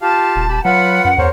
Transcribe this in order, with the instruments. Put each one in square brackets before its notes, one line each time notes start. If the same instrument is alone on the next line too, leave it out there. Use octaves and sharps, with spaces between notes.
[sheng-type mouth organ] F4 G4 F5 [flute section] A5
[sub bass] D#1
[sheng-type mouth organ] G4 B5
[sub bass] F#3 [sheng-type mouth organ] F4 B4 B5 [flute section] F#5
[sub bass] F#2
[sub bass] E2 [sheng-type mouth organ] A#4 C5 C#5